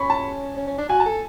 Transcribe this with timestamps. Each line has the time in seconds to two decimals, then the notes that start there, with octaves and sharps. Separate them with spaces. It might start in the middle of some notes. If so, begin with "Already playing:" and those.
Already playing: C#4 B5 C#6
0.10 A5
0.57 C#4
0.67 C#4
0.78 D4
0.89 F#4 G#5
1.00 A5
1.06 A4